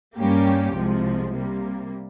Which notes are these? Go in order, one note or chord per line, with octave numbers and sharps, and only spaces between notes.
G2 G3 A#3 C#4 G4
C2 C3 F3 G#3
C3 G3 A#3